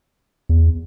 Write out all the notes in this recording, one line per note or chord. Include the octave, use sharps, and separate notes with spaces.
E2